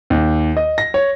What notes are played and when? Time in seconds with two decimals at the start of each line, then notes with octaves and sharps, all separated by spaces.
0.10 D#2
0.57 D#5
0.78 A#6
0.94 C#5